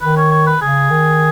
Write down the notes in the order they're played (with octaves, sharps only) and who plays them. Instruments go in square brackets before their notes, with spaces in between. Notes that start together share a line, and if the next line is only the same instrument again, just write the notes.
[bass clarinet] D#3 [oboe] B4
[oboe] C#5
C#5
B4
[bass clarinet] C#3 [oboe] G#4
[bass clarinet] D#3